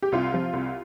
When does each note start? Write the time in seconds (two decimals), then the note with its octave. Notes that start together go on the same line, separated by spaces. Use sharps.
0.02 G4
0.12 C2 F4
0.32 C3 F3
0.53 C2